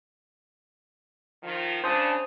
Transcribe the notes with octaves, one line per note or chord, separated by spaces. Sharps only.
D#3 F3 F4
C#3 D4 C5 A5 D#6